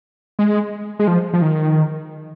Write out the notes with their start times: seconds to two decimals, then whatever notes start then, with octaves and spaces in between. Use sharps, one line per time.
0.39 G#3
0.99 G#3
1.08 F3
1.33 F3
1.42 D#3